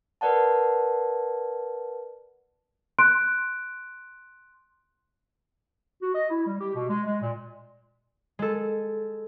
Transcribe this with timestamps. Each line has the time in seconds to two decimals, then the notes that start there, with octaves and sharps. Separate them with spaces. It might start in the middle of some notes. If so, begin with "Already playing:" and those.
0.21 A#4 B4 D5 F#5 A5
2.99 C6 F#6 D7
6.02 F#4
6.15 D#5
6.30 E4
6.47 G3
6.61 G4
6.75 B2
6.89 G#3
7.06 G#3
7.22 A#2
8.39 G#3 A4